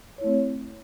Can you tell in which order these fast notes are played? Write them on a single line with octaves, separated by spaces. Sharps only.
C#5 E4 A3 C4